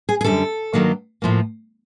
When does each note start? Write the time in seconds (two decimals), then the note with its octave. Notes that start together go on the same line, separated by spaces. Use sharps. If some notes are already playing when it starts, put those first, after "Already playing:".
0.09 G#4
0.21 G#4
0.24 F#2 D3 G3 A4
0.73 G2 D#3 F#3 A#3
1.22 A2 F3 A#3